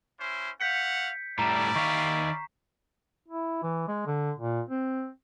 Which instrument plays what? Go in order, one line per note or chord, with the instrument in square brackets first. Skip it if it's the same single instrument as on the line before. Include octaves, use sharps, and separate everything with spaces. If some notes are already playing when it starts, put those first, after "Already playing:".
[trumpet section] C#4 E4 C5
[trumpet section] A3 F5 F#5 [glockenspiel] G6 B6 C#7
[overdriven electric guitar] A2 G3 [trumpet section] C#4 E4 D5 [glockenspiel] A#5 E7
[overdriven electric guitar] D#3 F5 [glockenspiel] C#6 B6 C7
[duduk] E4
E3
G#3
D3
A#2
C4